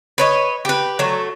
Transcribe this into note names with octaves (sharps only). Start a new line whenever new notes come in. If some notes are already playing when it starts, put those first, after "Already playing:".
B4 C#5 D#5
G4 B4
F#3 A3